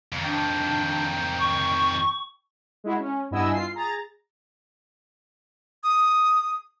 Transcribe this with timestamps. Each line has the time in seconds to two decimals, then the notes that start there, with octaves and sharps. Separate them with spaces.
0.12 F2 D#3
0.24 D4 G5
1.39 C#6
2.84 G#3 E4 F#4
2.99 C#4
3.31 G2 B3 E4 D#5 G#5 E6
3.53 F4 C7
3.74 G#4 A#5 A6
5.84 D#6